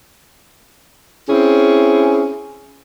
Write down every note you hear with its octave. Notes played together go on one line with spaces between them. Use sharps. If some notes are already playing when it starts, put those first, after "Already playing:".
C4 C#4 E4 G#4